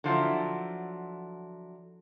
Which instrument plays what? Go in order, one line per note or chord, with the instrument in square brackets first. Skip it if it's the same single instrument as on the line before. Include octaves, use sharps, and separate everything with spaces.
[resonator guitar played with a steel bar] D3 F3 F#3 E4